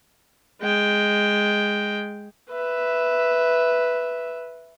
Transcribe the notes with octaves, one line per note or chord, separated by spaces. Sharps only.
G#3 G5
B4 E5